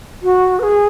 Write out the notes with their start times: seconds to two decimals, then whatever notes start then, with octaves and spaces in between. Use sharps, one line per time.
0.23 F#4
0.59 B4
0.63 G#4